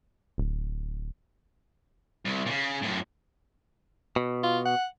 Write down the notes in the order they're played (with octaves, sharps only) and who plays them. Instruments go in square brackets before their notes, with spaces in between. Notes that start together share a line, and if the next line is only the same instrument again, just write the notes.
[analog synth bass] D1
[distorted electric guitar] C2
A#2 C#3
F#2 A2
[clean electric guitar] B2
[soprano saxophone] F4
F#5